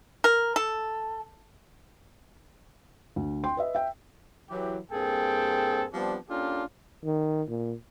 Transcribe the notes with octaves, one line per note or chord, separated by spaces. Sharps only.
A#4
A4
D2
G5 C6
B4 D#5 E5
E5 G5
E3 F#3 G4
G2 A#3 C4 G#4 A4 G5
F3 G3 B3 C4 D4
A#3 C#4 D4 F4 G4 A4
D#3
A#2